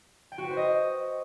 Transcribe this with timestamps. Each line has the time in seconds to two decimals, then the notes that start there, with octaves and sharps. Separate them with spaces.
0.32 G5
0.38 F#4
0.44 B4
0.51 C5
0.57 D#5